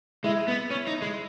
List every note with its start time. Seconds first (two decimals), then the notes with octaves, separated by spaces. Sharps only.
0.24 G#3 E4
0.48 B3
0.70 C#4
0.87 D#4
1.02 G#3